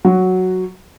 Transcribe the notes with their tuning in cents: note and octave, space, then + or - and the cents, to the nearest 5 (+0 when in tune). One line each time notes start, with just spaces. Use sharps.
F#3 +0 F#4 +0